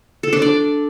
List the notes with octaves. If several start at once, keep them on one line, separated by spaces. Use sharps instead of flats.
A4
D4
D5